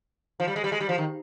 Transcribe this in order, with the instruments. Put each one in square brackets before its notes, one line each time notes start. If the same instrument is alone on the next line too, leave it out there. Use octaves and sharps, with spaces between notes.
[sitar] F3
G3
G#3
G3
G#3
G3
F3
D#3